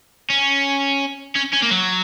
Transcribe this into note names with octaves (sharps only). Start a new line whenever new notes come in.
C#4
C#4
C#4
A#3
F#3